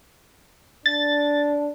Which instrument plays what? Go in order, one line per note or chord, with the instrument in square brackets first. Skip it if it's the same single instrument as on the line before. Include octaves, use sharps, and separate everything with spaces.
[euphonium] D4 [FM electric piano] A6